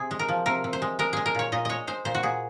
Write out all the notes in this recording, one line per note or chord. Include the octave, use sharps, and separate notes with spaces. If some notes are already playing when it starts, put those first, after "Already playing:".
Already playing: C3 G#4
G#3
A#4
F3
C3 A#4
C3
C5
G#3
G#3 A#4
G#3 G#4
A#4
A#2 C#5
A#2 D#5
G#3 C#5 D#5
G#3 C5
A#2 C5
F#4
A#2 G#4